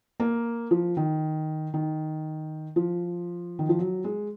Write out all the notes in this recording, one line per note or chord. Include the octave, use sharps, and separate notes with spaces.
A#3
F3
D#3
D#3
F3
D#3
F3
F#3
G#3